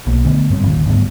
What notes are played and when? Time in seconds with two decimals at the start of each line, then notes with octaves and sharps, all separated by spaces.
0.07 B1 A#3
0.25 D3 A3 B3
0.50 G2 G3 C4
0.63 G1 D#2 A#2 D#3
0.87 D2 G#2 G3 B3